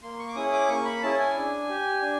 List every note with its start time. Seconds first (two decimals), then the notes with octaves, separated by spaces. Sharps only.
0.03 A#3 C6
0.19 C#6
0.28 D6
0.35 C#4 E4 G#4 D#6
0.52 D6
0.69 A#3 C#6
0.85 B5
1.02 C#4 E4 G#4 A5
1.19 G#5
1.36 D4
1.69 G4
2.02 D4